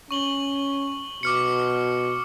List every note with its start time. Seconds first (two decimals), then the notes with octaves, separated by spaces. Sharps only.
0.11 C#4 C#6 F#7 G7
1.23 B2 D6 F6 C#7